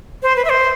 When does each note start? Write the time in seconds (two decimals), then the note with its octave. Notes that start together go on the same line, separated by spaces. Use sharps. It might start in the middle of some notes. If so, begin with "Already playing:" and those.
0.23 C5
0.36 B4
0.45 E5
0.49 C5